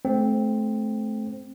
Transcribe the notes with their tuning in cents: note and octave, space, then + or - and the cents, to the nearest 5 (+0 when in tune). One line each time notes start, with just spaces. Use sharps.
A3 -25 C4 +0